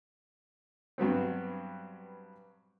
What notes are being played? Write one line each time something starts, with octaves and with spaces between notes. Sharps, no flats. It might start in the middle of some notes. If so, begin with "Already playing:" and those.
G2 F#3 B3 C4